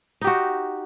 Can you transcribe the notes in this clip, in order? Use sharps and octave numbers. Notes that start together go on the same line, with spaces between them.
D#4 F#4 G4